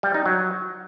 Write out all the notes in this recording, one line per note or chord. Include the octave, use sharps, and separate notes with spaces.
G3
D#4
F#3